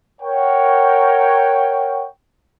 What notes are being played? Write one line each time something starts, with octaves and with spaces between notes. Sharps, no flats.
A#4 C#5 F#5 G5